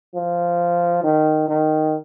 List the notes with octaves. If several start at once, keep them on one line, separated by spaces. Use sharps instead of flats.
F3
D#3
D#3